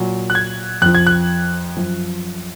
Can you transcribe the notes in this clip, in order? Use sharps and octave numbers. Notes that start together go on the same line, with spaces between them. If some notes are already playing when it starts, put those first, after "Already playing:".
Already playing: A#2 F#3
F#6
G#6
F2 F3 F#6
G#6
F#6
F#2 F3